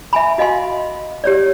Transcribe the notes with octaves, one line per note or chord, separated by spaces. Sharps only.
E5 G#5 B5
F#4 D#5 F5 G#5 C6
G4 C#5 D5